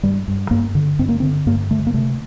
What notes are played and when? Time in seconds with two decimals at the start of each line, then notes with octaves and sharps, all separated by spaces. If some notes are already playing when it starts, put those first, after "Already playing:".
0.03 G2 G3
0.28 G2
0.51 G2 A#3
0.75 D3
0.99 G2 C4
1.09 A#3
1.20 D3 C4
1.46 G2 A#3
1.70 D3 A3
1.87 A#3
1.94 C3 A3